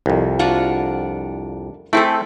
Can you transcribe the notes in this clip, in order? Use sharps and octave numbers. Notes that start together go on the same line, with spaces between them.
C2 F2
D4 F4 F#4
A3 C4 E4 G#4 A4